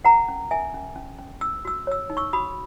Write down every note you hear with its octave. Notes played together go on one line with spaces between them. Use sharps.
A#4 F#5 A#5
C#4
A#4 E5 G#5
C#4
C#4
C#4
C#4 E6
F#4 E6
C#5 E6
D#4
C#6 E6
F#4 B5 D#6